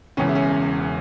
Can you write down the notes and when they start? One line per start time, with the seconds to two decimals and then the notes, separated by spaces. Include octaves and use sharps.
0.17 E1 E2 C#3 C#4
0.29 E4
0.35 C#4